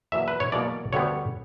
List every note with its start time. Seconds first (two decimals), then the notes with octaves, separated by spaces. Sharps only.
0.12 E2 B2 F#3 A#3 E5
0.28 B4
0.40 C#5
0.52 E2 B2 F#3 A#3 D5
0.93 D2 D3 G3 B3 C#5